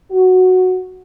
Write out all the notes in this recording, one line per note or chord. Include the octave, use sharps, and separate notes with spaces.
F#4